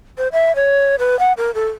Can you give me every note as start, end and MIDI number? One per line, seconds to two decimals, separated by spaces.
0.18 0.28 72
0.33 0.55 76
0.56 0.96 73
0.99 1.19 71
1.19 1.33 78
1.37 1.53 70
1.55 1.69 69